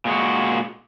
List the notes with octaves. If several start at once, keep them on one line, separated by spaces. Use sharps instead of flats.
A#2 G#3 F#4